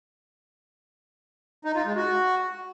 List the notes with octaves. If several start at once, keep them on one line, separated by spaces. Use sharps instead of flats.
D#4
F4
G#3
F#4